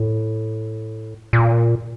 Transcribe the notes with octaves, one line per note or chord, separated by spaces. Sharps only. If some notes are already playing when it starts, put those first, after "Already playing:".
Already playing: A2
A#2